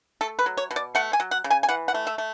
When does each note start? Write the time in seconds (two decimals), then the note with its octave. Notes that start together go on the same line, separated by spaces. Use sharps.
0.21 A3 A4
0.39 B4
0.46 F#3
0.57 C#5
0.71 B2
0.76 D5
0.95 A3 F#5
1.13 G#5
1.20 F#3
1.31 F#5
1.44 C#3
1.50 G#5
1.63 G#5
1.69 E3 F#5
1.88 F#5
1.94 A3
2.07 E5
2.18 A3